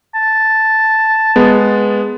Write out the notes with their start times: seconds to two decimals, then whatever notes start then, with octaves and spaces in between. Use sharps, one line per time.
0.15 A5
1.36 G#3 B3